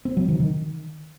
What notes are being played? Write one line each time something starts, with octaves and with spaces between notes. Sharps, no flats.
C4
F#3
D#3
D#3